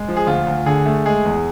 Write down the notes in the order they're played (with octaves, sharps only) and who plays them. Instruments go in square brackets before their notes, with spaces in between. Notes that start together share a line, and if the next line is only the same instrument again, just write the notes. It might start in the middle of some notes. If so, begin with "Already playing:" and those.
Already playing: [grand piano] G#3
F3
G#4
D2 F4
D2
D3 G#4
A3
G#3 G#4
E2